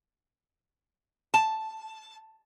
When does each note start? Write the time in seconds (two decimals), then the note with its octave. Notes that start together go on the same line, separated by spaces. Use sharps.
1.34 A5